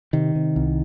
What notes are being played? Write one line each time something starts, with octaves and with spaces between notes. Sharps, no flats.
C3 D#3
C3
C2